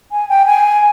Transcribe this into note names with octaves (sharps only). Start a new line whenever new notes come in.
G#5
G5
G#5